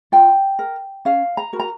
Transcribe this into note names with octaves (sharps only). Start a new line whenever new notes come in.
F4 G5
A#4
C#4 F5
A#5
F#4 A#4
A#5